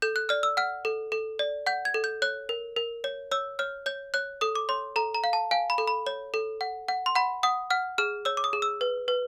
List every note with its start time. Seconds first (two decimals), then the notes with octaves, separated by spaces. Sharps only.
0.02 A4 G6
0.16 F#6
0.29 D5 F6
0.43 E6
0.57 F#5 F6
0.85 A4
1.12 A4
1.39 D5
1.66 F#5 G6
1.85 G#6
1.94 A4
2.04 G6
2.22 C#5 F#6
2.49 A#4
2.76 A#4
3.04 C#5
3.31 C#5 E6
3.59 C#5 F6
3.86 C#5 G6
4.14 C#5 F#6
4.41 A4 D#6
4.56 D6
4.69 C#5 C6
4.96 A4 A#5
5.15 A#5
5.24 F5
5.33 A5
5.51 F5 G#5
5.70 B5
5.78 A4
5.88 B5
6.06 C#5
6.34 A4
6.61 F#5
6.88 F#5
7.06 C6
7.15 F#5 B5
7.43 F#5 D#6
7.70 F#5 F6
7.98 G#4 F6
8.25 C#5 E6
8.37 D6
8.44 D#6
8.53 G#4
8.62 E6
8.81 B4
9.08 B4